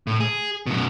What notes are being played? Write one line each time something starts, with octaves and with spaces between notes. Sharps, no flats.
A2
G#4
F#2 B2